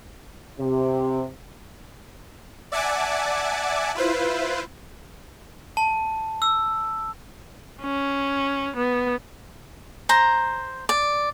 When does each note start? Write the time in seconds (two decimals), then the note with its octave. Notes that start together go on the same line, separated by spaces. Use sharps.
0.59 C3
2.72 D5 E5 F#5 G#5 A5 D6
3.95 E4 F4 B4 C5
5.77 A5
6.42 E6
7.82 C#4
8.77 B3
10.09 C5 A#5
10.89 D5